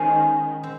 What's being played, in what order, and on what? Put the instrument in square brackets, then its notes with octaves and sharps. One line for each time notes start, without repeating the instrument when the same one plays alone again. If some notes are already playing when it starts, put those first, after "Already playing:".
Already playing: [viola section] D#3 [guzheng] G#3 C#4 F4 G#4 C5
[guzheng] C4